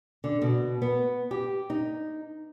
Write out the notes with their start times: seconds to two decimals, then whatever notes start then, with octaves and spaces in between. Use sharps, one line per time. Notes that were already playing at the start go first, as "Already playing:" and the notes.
0.24 D3
0.42 B2
0.82 B3
1.31 G4
1.70 D#4